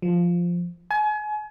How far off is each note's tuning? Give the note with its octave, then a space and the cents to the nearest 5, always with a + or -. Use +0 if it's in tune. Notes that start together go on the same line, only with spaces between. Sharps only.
F3 -5
G#5 +35